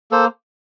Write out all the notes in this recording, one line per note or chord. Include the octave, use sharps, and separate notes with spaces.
A#3 A4 C5